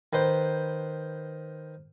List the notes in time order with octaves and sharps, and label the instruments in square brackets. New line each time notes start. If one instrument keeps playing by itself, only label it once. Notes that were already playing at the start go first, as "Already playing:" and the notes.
[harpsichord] D#3 B4 C5 G5